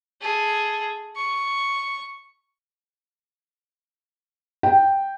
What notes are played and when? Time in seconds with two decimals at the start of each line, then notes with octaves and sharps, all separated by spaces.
0.21 G#4 A4
1.17 C#6
4.63 G5